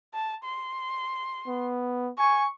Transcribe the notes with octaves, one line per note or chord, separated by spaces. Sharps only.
A5
C6
B3
G#5 C#6